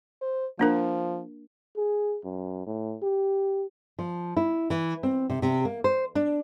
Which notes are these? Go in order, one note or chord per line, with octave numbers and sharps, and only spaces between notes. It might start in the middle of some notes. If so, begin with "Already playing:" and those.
C5
F3 A#3 D4 A#4
G#4
F#2
A2
G4
F3
E4
E3
C4
C3
C3
A#3
C5
D4